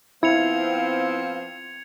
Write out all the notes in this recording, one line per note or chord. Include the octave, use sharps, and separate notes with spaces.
F3 B3 C4 E4 F5 G#6 C#7 F7